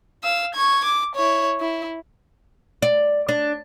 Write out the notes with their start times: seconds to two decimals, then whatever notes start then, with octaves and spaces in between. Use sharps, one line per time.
0.24 F5 E6
0.55 C#6 G#6
0.84 D6
1.15 E4 C#5
1.61 E4
2.82 D5
3.29 D4